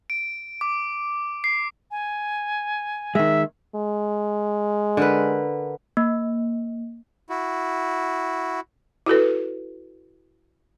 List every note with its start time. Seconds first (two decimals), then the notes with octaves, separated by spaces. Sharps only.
0.10 D7
0.61 D6
1.44 C7
1.91 G#5
3.15 D#3 G#3 E5
3.75 G#3
4.97 D3 A#4 B4
5.97 A#3
7.30 E4 F#4
9.06 E4 F#4 A4 B4